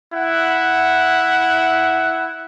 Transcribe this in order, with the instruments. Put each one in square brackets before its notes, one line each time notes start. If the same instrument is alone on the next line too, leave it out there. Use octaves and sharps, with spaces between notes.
[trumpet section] E4 E5 F#5